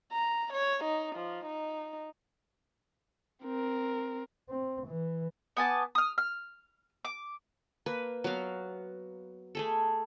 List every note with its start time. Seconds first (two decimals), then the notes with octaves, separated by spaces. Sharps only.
0.12 A#5
0.53 C#5
0.84 D#4
1.16 F3
1.46 D#4
3.44 C4 A#4
4.49 C4
4.87 E3
5.57 B3 G#5 A5 D6
5.95 D#6 F6
6.18 F6
7.05 D6
7.86 A#3 B4
8.24 F#3 B3 F#4 F5
9.55 A3 G#4 A4